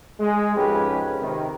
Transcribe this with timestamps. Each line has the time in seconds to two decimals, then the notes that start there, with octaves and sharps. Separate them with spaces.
0.20 G#3
0.56 F2 G#2 G#3 C#4 G4 B4
1.21 C3 D#3